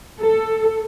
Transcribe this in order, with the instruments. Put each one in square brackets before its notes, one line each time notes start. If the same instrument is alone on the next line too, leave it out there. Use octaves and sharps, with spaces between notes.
[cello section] A4